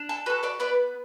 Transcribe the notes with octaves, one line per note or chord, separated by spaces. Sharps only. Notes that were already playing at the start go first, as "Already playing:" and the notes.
Already playing: D4
A4
F#4 A4 B4
B4 D5
B3 B4 D5